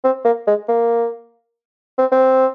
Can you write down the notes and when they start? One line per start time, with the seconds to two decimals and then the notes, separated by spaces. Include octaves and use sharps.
0.04 C4
0.25 A#3
0.47 G#3
0.68 A#3
1.98 C4
2.12 C4